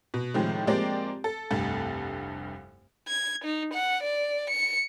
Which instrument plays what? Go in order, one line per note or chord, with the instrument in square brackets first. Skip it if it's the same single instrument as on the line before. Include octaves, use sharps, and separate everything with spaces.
[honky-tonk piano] B2
A2 C3 D#3 F3 G#3
F3 G#3 A#3 C4 G4 D5
A4
F1 C2 G2 A4
[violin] G#6
D#4
F#5
D5
C#7